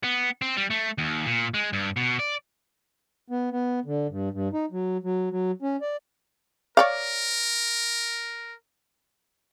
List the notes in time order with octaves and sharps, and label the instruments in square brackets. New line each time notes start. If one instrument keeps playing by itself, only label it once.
[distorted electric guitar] B3
C4
G3
A3
D#2
A#2
G#3
G2
B2
D5
[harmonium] B3
B3
D3
G2
G2
D#4
F#3
F#3
F#3
C#4
D5
[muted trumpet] A#4 [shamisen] C#5 D5 F5